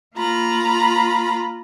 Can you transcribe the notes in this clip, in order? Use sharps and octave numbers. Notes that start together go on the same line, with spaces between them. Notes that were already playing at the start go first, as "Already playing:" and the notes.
A#3 F4 A#5 B5